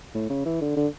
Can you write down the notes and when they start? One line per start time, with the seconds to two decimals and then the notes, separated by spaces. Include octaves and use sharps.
0.15 A2
0.30 C#3
0.46 E3
0.61 D3
0.77 D3